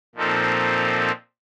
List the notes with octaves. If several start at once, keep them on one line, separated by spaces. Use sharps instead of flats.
A#2 F3 C4 D#4 A4